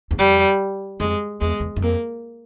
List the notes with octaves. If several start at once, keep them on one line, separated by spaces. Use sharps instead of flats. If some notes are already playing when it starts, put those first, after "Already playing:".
E2
F2 G3
F2 G#3
E2 G#3
E2
F#2
F2 A#3